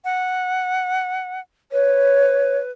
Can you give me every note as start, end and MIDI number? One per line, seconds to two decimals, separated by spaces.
0.05 1.40 78
1.72 2.71 71
1.72 2.58 73